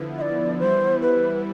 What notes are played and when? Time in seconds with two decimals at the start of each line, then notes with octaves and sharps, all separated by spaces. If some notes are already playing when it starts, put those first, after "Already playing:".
Already playing: D3 F3 B3 E4
0.18 E5
0.22 D5
0.59 E3 G3 B3 E4 C5
1.02 B4